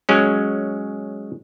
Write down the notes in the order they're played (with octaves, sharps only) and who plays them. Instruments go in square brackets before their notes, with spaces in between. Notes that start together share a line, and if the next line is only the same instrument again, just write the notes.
[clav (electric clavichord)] F#3 G#3 C#4